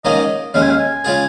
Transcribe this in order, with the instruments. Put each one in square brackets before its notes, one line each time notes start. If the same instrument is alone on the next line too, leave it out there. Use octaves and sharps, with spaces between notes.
[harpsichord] G#2 D#3 A#3 C#4 [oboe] D#5
[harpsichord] D#2 C#3 G#3 [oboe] F5
[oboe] G#5
F5
G#5
[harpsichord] C#3 G#3 F4 G#4